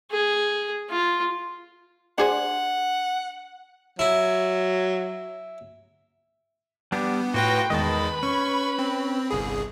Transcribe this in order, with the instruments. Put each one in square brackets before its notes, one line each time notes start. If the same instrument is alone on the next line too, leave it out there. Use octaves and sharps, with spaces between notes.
[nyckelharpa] G#4
F4
[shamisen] D4 G#4 C5 [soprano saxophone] F#5
[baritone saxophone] F#3 [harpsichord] E4
[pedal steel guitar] G3 D4 G4 [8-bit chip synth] B3
[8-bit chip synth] A2 B4 A#6 [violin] F4 G5 [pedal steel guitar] F#4
[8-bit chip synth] E2 D#3 G#3 [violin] B4 B5 [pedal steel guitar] D#5 A5
[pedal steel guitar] C#4 [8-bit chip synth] C#6
[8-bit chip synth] C4
G1 C2 G#4